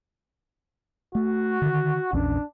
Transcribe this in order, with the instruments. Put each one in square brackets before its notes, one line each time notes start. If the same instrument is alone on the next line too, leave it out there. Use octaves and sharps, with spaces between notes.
[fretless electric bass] A3 [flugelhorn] F#4
[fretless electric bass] D3 D#3
[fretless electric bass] A#1 E2 C#4 [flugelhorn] D4